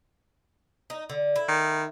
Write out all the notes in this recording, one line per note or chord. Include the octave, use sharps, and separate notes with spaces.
D#4
D3
E4
D#3